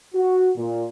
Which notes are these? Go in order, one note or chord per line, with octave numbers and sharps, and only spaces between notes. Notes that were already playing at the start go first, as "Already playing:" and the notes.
F#4
A#2